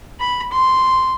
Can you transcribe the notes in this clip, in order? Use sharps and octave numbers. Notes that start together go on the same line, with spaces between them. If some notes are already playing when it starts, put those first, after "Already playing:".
B5
C6